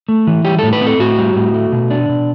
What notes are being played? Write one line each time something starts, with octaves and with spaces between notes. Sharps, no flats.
A3
E3
G3 G4
A2 A4
B4
C4
A4
A2 F#4
G3
A2
A3
B2
D4
B2